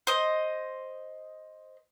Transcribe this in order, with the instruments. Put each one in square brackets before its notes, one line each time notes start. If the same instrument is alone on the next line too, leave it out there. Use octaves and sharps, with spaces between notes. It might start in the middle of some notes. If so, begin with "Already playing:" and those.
[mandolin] C5 D#5